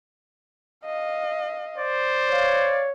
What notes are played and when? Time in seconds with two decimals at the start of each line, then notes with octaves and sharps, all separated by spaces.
0.85 D#5 F5
1.78 C5 D5
2.30 C#5 F5